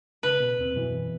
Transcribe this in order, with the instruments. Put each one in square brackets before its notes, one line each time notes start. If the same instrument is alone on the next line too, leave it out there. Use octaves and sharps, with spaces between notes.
[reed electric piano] C#3 [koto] B4
[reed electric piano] B2
D#2 C4
F#2 B2 E3